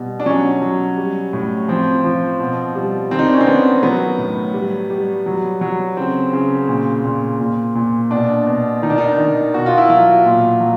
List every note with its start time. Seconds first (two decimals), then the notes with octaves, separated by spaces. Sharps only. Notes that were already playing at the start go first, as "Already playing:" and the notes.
Already playing: B2 G3
0.20 D4
0.26 F#3 C#4
0.62 F#3
0.97 G3
1.33 A2
1.68 F3 C4
2.04 F3
2.40 B2
2.76 G3
3.11 D#3 C4
3.19 D#4
3.26 D4
3.34 C#4
3.41 C4
3.47 D#3 B3
3.83 F#3 B3
4.18 A2
4.54 G3
4.90 G3
5.26 F#3
5.61 F#3
5.97 C#3 C4
6.33 C#3
6.68 A#2
7.04 A#2
7.40 A#2
7.75 A#2
8.11 B2 D4
8.47 B2
8.82 D#3 D#4
8.90 D4
8.98 D#4
9.18 D#3
9.54 B2 F#4
9.66 F4
9.78 E4
9.90 F#3 F4
10.25 A#2
10.60 F#3